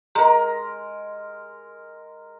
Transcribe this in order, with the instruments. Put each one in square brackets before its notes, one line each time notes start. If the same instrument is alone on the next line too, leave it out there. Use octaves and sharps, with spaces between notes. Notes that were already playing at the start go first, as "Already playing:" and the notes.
[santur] G#3 A#4 [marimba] A#5